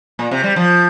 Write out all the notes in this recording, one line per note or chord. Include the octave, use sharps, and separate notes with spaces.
A#2
C3
G3
F3